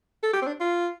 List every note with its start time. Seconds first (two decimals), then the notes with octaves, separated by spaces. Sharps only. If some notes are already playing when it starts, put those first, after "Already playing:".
0.23 A4
0.33 G4
0.42 C4
0.47 D4
0.61 F4